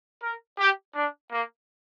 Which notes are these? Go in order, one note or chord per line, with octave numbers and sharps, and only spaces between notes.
A#4
G4
D4
A#3